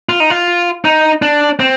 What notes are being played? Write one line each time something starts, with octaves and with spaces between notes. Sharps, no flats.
F4
D#4
F4
D#4
D4
C4